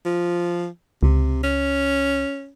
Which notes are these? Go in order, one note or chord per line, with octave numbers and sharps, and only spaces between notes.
F3
C#2 C3
C#4